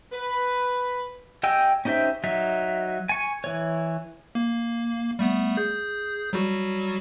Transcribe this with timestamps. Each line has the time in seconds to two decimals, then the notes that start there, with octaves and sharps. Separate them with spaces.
0.12 B4
1.43 G4 D#5 G5 G#5 E6
1.85 C#4 D#4 G4 C5 E5
2.24 F#3 D#4 E5
3.09 G#5 C#6
3.44 E3 C#5
4.35 A#3
5.19 G3 A3 B3
5.57 G#4 G6
6.33 F#3 G3 F#4